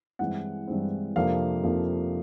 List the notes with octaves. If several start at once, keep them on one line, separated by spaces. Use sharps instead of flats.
G2 E3 G#3 C4 F#5
G2 E3 G#3 C4
F2 C3 F3 A#3 D4 F5
F2 C3 F3 A#3 D4